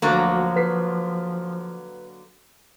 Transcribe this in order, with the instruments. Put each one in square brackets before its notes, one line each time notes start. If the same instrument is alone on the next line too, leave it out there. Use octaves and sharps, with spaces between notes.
[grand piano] D2 [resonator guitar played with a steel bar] D3 F#3 A#3 [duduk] F3
[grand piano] B4 B6 C7